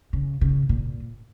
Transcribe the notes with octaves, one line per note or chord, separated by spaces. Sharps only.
C#3
C#3
A#2